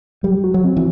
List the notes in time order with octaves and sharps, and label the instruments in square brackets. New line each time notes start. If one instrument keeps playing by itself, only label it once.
[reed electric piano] F#3 [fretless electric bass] G3
[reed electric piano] F#4
[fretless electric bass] F#3
[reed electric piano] C4
[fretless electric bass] E3